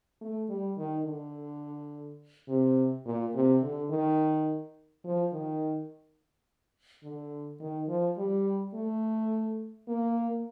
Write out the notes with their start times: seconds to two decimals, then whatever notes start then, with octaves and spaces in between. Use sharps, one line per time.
0.21 A3
0.49 G3
0.78 D#3
1.06 D3
2.49 C3
3.06 A#2
3.34 C3
3.62 D3
3.90 D#3
5.04 F3
5.33 D#3
7.04 D3
7.60 D#3
7.88 F3
8.18 G3
8.74 A3
9.88 A#3